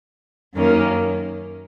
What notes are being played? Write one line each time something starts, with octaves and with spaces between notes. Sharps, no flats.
F#2 D#3 A#3 C#4